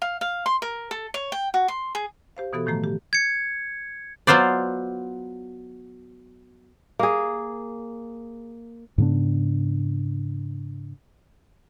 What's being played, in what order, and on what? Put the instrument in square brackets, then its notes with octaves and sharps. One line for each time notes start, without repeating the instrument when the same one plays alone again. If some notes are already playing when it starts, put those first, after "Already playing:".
[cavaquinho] F5
F5
C6
A#4
A4
C#5
G5
F#4
C6
G#4
[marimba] G4 C5 F5
B2 E3 B3 F#4 A4
A2 D#3 F3 A3 A#5
G4
[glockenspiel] G#6 C#7
[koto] F#3 B3 F4 C5 D5
[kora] A#3 G#4
[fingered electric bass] G#2 C#3 B3 D4